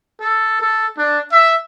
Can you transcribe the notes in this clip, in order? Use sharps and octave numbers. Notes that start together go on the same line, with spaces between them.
A4
A4
D4
E5